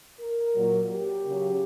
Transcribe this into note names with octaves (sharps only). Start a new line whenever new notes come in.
A#4
A#2 F#3
G4
C#3 F#3